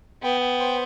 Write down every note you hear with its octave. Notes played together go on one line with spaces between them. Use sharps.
B3 G5
G5
C5